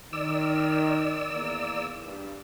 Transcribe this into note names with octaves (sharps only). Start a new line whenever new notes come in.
D#3 D5 E6
E2 A#3
G2